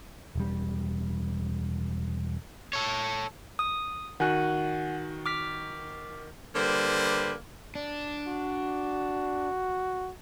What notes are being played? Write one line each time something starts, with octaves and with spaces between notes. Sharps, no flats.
E1 G3
A4 C#5
D#6
D#3 F#4 F#5 G#5 F#6
D6 F6 B6
D3 G3 A#3 B4 C5
D4
F#4